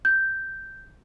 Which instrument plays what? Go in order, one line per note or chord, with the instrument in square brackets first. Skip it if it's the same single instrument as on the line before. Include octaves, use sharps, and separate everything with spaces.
[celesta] G6